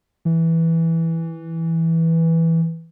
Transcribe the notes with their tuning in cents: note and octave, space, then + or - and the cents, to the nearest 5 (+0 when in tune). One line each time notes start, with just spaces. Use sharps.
E3 -5